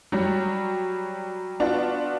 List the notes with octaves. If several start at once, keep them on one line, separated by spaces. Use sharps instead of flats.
F#3 G3
B3 D4 F4 F#4